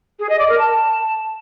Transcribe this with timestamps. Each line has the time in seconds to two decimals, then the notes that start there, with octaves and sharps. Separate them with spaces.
0.19 G#4
0.29 D#5
0.38 D5
0.48 A#4
0.58 A5